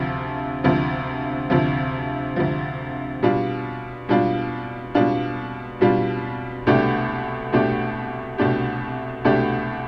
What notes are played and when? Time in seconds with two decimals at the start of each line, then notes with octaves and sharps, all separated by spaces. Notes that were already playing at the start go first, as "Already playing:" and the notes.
Already playing: D2 C3 F3
0.64 D2 C3 F3
1.50 D2 C3 F3
2.36 D2 C3 F3
3.23 B2 G3 D4 F4
4.09 B2 G3 D4 F4
4.95 B2 G3 D4 F4
5.81 B2 G3 D4 F4
6.66 C2 B2 A3 D4 G4
7.53 C2 B2 A3 D4 G4
8.38 C2 B2 A3 D4 G4
9.25 C2 B2 A3 D4 G4